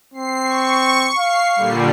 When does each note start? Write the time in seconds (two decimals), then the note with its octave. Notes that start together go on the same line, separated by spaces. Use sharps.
0.14 C4 C7
0.45 C#6
1.18 F5 C7
1.56 A#2 D3 G3